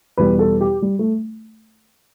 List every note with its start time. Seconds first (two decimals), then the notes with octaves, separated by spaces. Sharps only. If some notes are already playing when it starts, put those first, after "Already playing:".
0.17 E2 B2 G3 B4
0.39 A4
0.61 G4
0.82 G3
0.99 A3